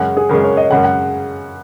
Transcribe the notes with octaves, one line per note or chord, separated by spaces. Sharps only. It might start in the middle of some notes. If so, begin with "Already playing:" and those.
Already playing: F#2 C#3 G#3 F#5
G#4
F#2 C#3 G#3 A#4
C#5
D#5
F#2 C#3 G#3 F#5
F#5